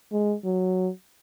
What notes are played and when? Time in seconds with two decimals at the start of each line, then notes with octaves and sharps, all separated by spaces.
0.12 G#3
0.44 F#3